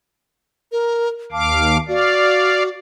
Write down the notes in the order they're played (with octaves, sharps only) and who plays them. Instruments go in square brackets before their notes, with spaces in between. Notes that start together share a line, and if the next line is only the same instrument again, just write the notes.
[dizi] A#4
[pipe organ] D#2 F5 D6 [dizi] A5
[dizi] F#4 [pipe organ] D5 F5